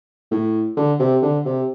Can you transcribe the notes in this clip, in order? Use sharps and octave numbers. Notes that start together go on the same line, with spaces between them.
A2
D3
C3
D3
C3